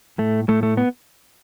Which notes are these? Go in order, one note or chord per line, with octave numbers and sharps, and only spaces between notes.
A2 A3
A2 A3
A3
B3